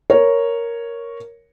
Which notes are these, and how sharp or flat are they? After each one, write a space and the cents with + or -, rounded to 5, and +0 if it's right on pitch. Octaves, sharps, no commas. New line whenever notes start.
A#4 +0 C#5 +0